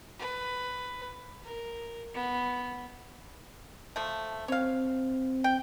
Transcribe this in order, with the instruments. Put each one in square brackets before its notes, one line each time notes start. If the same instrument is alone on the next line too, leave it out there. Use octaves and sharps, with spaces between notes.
[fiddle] B4
A#4
B3
[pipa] F3 A3
[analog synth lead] C4 [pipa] C#5 F5
[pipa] G5